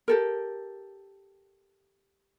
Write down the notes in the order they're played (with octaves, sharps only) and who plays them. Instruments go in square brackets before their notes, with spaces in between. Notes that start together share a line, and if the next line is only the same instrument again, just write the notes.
[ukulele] G4 A4 A#4